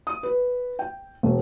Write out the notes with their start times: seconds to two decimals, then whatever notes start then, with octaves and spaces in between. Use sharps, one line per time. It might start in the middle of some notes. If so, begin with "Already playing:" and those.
0.07 D#6
0.23 B4
0.79 G5
1.23 E1